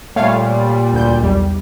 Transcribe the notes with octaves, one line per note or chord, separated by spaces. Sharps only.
A#2 G3 A3 C#5 F5
D2 G6
B1 E2 G3